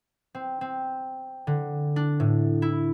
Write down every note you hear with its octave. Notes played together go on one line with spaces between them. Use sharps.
C4
C4
D3
D4
A2
E4